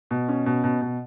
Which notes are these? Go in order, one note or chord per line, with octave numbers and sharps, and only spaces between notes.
B2
C#4
B2
B2
B2